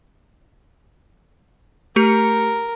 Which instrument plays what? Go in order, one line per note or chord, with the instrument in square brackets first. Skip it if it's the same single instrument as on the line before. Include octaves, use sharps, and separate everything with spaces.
[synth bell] A3 G4 C#7 [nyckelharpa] A#4